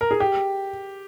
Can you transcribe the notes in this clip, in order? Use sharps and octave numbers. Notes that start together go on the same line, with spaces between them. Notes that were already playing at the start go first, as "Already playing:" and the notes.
A#4
G#4
G4